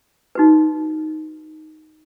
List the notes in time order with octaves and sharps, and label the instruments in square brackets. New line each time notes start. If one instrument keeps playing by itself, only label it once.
[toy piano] D#4 F#4 B4